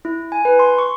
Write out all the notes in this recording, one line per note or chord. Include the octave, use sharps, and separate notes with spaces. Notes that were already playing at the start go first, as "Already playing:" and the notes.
E4
G#5
B4
C6
C#6